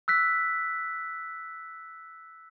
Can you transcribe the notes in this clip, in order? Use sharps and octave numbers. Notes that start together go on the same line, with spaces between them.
E6 F#6 B6